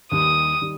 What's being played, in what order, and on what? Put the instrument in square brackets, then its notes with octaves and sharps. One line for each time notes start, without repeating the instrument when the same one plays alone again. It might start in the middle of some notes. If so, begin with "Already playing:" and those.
[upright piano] D#2 D#3 G3 [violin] D#6
[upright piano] D#3 G3